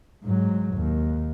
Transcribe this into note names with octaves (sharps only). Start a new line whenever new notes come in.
G#2 F#3
D#2